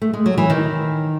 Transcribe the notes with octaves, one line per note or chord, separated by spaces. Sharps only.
A3
G#3
F#3
E3
D#3